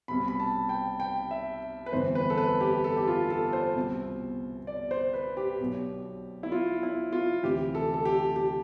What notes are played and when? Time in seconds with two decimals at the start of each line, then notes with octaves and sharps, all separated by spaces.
0.08 C2 B2 B5
0.28 B5
0.40 A5
0.69 G5
1.00 G5
1.31 E5
1.86 B4
1.92 G1 F2 E3 C5
2.15 B4
2.30 A4
2.38 B4
2.61 G4
2.84 A4
2.97 G4
3.07 F4
3.30 A4
3.53 C5
3.76 C2 B2
4.67 D5
4.91 C5
5.14 B4
5.37 G4
5.59 B1 B2
6.43 E4
6.52 F4
6.83 E4
7.13 F4
7.43 D2 C3 E3 G4
7.75 A4
7.94 A4
8.05 G4
8.36 G4